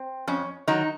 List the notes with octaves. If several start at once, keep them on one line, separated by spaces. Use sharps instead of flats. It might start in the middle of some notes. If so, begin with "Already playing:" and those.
Already playing: C4
F2 C#4
D#3 F#3 D#4